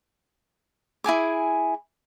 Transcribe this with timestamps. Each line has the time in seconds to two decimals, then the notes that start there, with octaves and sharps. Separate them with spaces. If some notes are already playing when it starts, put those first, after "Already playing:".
1.04 E4 G#4 G#5 D6